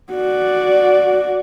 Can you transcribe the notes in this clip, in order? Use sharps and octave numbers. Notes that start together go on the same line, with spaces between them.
F#4 D5